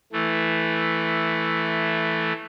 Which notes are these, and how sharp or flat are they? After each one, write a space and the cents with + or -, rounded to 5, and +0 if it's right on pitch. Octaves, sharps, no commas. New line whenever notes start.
E3 +0 A3 +0